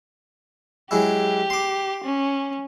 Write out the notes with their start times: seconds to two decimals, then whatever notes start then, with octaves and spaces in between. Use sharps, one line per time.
0.91 F#3 G#3 E4 G4
1.50 C6 D6
2.04 C#4